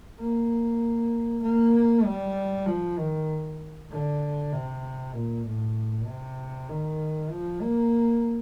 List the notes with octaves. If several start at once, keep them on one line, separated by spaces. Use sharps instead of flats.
A#3
A#3
G3
F3
D#3
D3
C3
A#2
A2
C3
D#3
F3
A#3